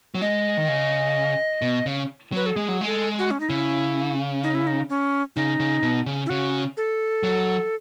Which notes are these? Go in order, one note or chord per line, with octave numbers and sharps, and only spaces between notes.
F#3
G#3 D#5
D#3
C#3
B2
C#3
F#3 B4
A4
G#3 G#4
F#3
G#3
A4
F#4
C#4
D#4
C#3 E4
D#4
E4
D#4
C#4
C#3 D#4
C#3
B2
C#3
E4
C#3 F#4
A4
F#3